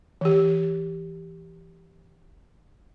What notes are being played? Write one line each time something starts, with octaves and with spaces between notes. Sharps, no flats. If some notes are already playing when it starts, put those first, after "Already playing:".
E3 G4